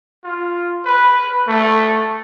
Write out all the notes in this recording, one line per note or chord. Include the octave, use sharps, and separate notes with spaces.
F4
B4
A3